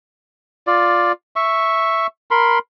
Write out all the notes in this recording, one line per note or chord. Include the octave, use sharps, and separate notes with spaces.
F4 D5
E5 C#6
A#4 B5 C6